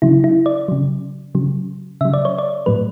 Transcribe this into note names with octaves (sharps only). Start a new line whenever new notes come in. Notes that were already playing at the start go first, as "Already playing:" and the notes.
C#3 F#3 E4
E4
D5
C#3 F#3
C#3 F#3
C#3 F#3 E5
D5
C#5
D5
A2 F#3 B4